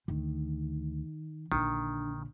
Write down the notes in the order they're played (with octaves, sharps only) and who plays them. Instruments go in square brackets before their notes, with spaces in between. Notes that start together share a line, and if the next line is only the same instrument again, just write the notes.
[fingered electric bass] D2 [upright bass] D#3
[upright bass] A#1 D3 [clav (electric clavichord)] D#3 [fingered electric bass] D4